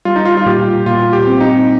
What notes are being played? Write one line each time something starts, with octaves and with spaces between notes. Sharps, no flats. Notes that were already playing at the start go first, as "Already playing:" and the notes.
G3 F4
D#4
F4
F4
A#2 G4
A#2 F4
G4
C4
D#4